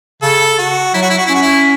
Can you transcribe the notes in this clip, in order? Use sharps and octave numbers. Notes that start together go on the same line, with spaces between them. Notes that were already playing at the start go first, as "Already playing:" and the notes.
C#3 A4
F#4
F#3 E4
F#4
E4
F#4
E4
C#4
F#4
E4